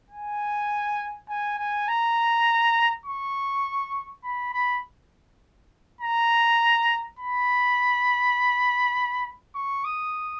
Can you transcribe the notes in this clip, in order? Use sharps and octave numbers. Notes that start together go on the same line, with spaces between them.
G#5
G#5
G#5
A#5
C#6
B5
B5
A#5
B5
C#6
D#6